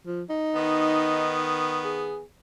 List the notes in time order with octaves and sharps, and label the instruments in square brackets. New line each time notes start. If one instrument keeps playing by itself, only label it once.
[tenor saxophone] F3
D#4
[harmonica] D#3 B3
[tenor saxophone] G#4